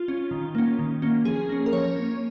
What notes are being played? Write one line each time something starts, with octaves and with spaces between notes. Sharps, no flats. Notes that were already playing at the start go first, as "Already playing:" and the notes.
Already playing: F4
C#4
D#3
A#3 C#4
D#3
A#3 C#4
F3 G#4
A#3 C#4
A#4
F3 C#5
A#3 C#4